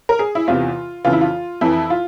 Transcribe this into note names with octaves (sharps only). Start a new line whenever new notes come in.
A#4
G#4
E4
E2 C3 E3 F4
F2 C#3 E3 F4
E4
F4
F2 E3 E4
F4